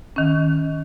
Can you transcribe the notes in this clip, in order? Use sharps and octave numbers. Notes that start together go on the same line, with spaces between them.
D#3 C#4